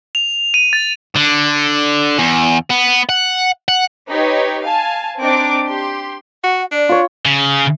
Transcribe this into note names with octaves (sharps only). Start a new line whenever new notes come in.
F7
D#7
A6
D3
E2
B3
F#5
F#5
D#4 G4 B4 C#5
F5 G#5 A5
C4 D4 D#4 D6
G4 C6
F#4 F#5
D4 D5
F4 C#5
C#3